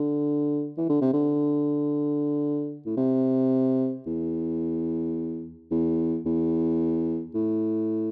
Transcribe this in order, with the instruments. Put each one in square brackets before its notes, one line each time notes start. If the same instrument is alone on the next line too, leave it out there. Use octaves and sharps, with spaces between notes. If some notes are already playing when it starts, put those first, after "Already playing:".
Already playing: [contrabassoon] D3
E3
D3
C3
D3
A2
C3
E2
E2
E2
A2